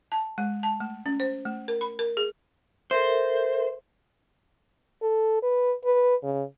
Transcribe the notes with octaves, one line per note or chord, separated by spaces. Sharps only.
A5
G#3
A5
A3
C#4
C5
A3
A#4
B5
A#4
G#4
A4 A#4 C5 E5
A4
B4
B4
C#3